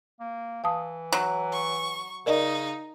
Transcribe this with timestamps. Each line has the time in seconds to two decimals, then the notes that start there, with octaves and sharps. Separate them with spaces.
0.20 A#3
0.64 E3 F5 A5 D#6
1.12 F#3
1.53 C#6
2.26 C#3 D#4 A#4 D5 D#5